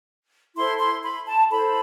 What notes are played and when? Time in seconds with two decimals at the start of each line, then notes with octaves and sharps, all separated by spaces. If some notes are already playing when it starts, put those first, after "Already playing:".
0.56 E4 A4 C5 C6
0.80 C6
1.03 B5
1.27 A5
1.51 E4 A4 C5 B5